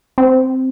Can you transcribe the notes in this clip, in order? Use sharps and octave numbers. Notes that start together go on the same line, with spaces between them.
C4